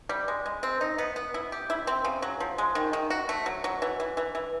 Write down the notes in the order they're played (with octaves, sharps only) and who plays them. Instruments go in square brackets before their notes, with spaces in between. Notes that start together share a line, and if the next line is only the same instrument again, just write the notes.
[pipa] G3
G#3
G#3
C4
D#4
B3
B3
E4
G4
E4
C4
C#3
F#3
F3
G#3
D#3
D#3
F#4
A3
F#3
F#3
E3
E3
E3
E3